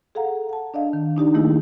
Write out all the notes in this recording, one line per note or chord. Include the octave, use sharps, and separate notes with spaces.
G#4 A4 F5 F#5 A#5
F#5 A5
D4 D5 D#5 F5
D#3
D4 D#4 G4 D5
D#3 G3 A3 A#3 E4 G#4